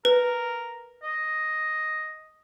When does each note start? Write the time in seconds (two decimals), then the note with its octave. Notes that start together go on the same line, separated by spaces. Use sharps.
0.05 A#4 B4
1.03 D#5